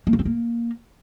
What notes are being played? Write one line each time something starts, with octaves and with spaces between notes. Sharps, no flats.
A#3
D4
C4
A#3